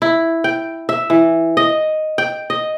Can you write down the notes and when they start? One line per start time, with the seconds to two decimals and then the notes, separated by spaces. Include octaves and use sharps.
0.02 E4
0.44 G5
0.89 E5
1.10 E3
1.57 D#5
2.18 G5
2.50 D#5